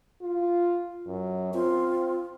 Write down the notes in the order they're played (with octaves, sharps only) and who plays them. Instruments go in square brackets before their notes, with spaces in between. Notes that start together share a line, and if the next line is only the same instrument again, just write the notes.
[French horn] F4
F#2
[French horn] C4 [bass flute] F4